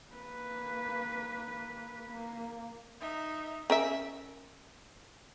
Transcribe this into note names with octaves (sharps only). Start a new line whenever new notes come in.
A#3 B4
A#3
D#4 E5
C#4 A#4 E5